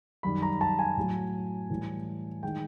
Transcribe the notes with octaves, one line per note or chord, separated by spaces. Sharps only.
F#2 D#3 G3 B5
A#5
A5
G#5
A2 F#3
A2 E3 G3
D#3 G#3 G5